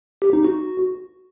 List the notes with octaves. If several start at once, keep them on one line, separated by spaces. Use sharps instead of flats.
G4
D#4
F#4